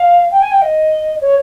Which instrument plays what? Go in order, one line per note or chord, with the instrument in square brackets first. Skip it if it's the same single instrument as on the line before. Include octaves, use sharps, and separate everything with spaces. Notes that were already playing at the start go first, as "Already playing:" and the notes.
Already playing: [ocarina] F5
G5
G#5
G5
D#5
C#5